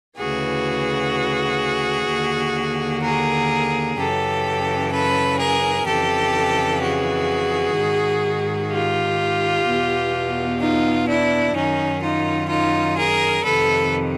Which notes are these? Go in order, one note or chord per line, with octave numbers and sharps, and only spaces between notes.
D2 C#3 E3 F#4 G#4
D#2 D3
G#4 A#4
F#2 C#3 E3 G4 A4
A4 B4
G#4 A#4
F2 C#3 E3 G4 A4
F#4 G#4
G#2 D#3
F4 G4
E2 B2
D#4 F4
D4 E4
F#2 D#3 C#4 D#4
D#4 F4
D#4 F4
G#4 A#4
F2 C3 D#3 A4 B4